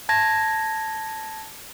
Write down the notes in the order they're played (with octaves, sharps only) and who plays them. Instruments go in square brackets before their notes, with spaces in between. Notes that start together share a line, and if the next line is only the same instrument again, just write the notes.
[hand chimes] A5 G#6 A#6